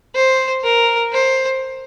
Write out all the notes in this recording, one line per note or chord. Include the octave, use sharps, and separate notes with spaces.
C5
A#4
C5